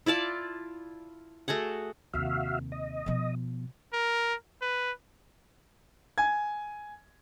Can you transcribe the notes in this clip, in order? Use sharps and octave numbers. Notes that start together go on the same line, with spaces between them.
E4 F4 D5 A5
A3 F#4 G#4 F#5
D#2 C3 F#4 E5 F5
D#5
B2 F3
A#4
B4
G#5 G#6